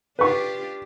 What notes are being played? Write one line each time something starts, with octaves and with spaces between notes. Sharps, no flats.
D4 F4 G4 B4 C#6